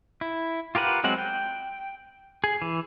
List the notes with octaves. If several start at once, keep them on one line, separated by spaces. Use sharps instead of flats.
E4
F4 G4 A#4 B4 F#5
F#3 G#3 C4 F#5
G5
G#4
E3